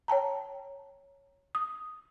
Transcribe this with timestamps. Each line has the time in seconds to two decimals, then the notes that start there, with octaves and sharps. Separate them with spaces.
0.08 C#5 G5 A5 A#5
1.55 D#6